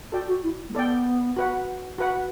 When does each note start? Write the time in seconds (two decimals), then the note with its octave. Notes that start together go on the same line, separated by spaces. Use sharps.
0.12 F#4 A4 D5 G5
0.28 F#4
0.44 E4
0.69 A3
0.75 B3 A4 D5 G5
1.37 F#4 B4 F#5
1.98 F#4 B4 F#5